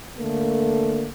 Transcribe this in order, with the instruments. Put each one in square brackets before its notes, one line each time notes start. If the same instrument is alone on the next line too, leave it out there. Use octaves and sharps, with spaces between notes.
[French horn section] D3 A3 A#3